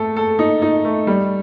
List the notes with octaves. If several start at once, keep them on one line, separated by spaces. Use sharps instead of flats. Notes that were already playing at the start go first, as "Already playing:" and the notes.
Already playing: A3 A4
A4
D#4
D#4
A3
G3